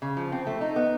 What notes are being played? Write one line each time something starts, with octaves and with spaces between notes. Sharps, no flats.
C#3
F3
C4
A3
D#4
B3